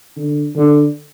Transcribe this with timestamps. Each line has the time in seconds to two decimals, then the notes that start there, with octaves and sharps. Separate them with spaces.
0.16 D3
0.55 D3